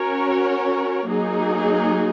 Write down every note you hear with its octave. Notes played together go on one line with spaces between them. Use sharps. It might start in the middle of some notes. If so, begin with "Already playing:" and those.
Already playing: C#4 F#4 A#4 C#5
F#3 A#3 D#4 G#4